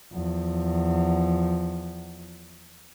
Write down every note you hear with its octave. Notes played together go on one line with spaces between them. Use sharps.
E2 F3